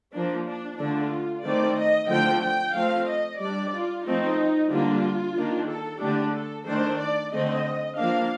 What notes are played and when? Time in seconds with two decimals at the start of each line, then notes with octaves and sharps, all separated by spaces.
0.13 F3 A#3 D4
0.47 D4
0.79 D3 A3 D4 F4
1.44 D#3 A3 C4 D5
1.77 D#5
2.09 D3 F3 A3 C4 G5
2.42 G5
2.75 F3 A3 C4 F5
3.08 D#5
3.40 G3 D4 D5
3.73 F4
4.06 F3 A3 C4 D#4
4.71 D3 G3 A#3 D4 F4
5.36 D#3 A#3 D4
5.69 A4
6.02 D3 A3 D4 G4
6.34 A4
6.67 D#3 A3 D4 C5
7.00 D5
7.32 D3 A3 C4 D#5
7.98 F3 A#3 D4 F5